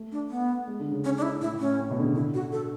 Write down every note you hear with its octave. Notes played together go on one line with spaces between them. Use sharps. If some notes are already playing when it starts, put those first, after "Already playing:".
Already playing: A3
D4
B3
G#3
D3
C#3
C#4
D4
E4
A2 E4
A2
C#4
A2
B2
D3
C#3
D3 E4
F#4
A4